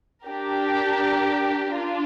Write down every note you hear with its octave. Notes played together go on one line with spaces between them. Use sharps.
D4 G4 A#4
D4 F4